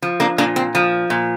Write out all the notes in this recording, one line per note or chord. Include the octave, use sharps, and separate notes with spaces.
F3
A#3 D4
A#2 A#3 D4
C4
F3
A#2